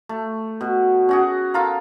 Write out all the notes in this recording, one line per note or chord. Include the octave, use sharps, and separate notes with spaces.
A3
B2
C#4 F#4 G#4
F4 A4 A#4 F5